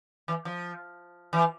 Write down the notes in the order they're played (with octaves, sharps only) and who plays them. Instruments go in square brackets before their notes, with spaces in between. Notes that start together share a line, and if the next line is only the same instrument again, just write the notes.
[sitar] E3
F3
E3